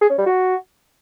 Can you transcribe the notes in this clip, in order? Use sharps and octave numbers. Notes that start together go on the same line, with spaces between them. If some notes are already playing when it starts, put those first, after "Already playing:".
G#4
C#4
G3
F#4